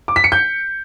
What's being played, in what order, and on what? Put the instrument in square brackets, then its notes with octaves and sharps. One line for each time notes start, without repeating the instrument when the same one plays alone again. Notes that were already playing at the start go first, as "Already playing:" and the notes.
[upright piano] D6
B6
C#7
G6